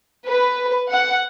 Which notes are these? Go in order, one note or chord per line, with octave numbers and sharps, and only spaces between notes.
B4
F#5